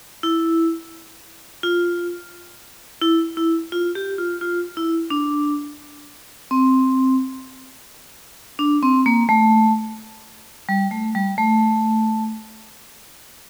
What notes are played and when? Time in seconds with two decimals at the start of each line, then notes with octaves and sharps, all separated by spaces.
0.23 E4
1.63 F4
3.02 E4
3.37 E4
3.72 F4
3.95 G4
4.18 F4
4.41 F4
4.77 E4
5.10 D4
6.51 C4
8.59 D4
8.83 C4
9.06 A#3
9.29 A3
10.69 G3
10.91 A3
11.15 G3
11.38 A3